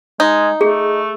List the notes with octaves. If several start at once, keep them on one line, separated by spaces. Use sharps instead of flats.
G#3 D#4
A3 G#4